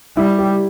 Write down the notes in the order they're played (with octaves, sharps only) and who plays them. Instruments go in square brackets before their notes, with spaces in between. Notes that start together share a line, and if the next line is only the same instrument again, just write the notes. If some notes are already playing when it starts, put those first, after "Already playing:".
[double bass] G3 [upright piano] E4
[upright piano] G4